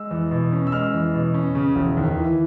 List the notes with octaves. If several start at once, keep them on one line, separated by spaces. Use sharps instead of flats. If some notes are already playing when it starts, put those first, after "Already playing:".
Already playing: G#3 E6
E2
B2
C#4
E6
G#3 F6
E2
B2
C#4
C#3
E1
D#2
E3